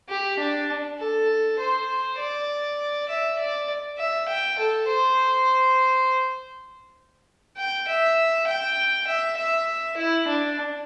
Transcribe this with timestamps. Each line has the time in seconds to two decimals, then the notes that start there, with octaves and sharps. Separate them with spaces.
0.09 G4
0.39 D4
0.99 A4
1.59 C5
2.18 D5
3.09 E5
3.38 D5
3.98 E5
4.28 G5
4.59 A4
4.88 C5
7.57 G5
7.88 E5
8.47 G5
9.07 E5
9.37 E5
9.97 E4
10.27 D4